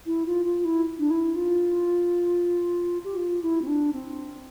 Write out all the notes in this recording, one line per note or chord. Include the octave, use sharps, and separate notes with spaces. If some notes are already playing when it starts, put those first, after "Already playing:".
E4
F4
F4
E4
D4
E4
F4
G4
F4
E4
C4
D4
C4